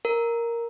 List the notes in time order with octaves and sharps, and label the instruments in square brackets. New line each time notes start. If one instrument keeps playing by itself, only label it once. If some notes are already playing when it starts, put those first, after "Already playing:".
[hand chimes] A#4